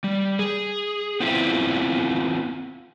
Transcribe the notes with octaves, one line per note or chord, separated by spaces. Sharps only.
G3
G#4
B3 C4 E4 F4 E5 G5